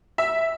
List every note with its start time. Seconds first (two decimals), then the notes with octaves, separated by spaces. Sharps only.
0.18 E5